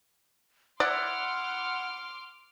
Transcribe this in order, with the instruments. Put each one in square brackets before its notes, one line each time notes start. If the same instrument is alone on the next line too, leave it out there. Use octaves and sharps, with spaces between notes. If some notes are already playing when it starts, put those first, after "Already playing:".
[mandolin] E4 F#6 [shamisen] D5 [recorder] F#5 [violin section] C6 D6 F6